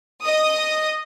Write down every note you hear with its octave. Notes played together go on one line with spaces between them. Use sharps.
D#5 D#6